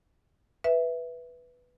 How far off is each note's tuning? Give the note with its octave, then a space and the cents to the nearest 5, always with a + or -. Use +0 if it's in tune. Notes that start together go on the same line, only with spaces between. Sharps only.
B4 +0 E5 +0